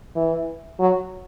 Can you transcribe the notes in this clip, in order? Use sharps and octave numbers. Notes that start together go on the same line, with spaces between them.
E3
F#3